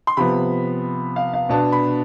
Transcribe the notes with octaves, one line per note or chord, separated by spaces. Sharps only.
C6
C3 F3 B3 B5
F5
F5
B2 B3 D4 A5
B5